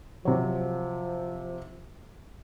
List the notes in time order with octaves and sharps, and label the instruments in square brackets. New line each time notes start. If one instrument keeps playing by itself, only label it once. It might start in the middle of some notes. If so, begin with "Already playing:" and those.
[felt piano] C3 F#3 [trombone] F3